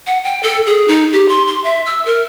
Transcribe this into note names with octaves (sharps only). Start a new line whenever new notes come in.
F#5
G5
A4
G#4
D#4
G4
C6
C6
E5
E6
A#4